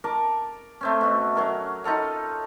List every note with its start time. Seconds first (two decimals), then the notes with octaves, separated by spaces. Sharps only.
0.04 A#4 A5 D6
0.81 A3 C4 C#4
1.01 B2 F#4
1.35 F#3 C#4 A#4
1.84 D#4 F4 A4 F5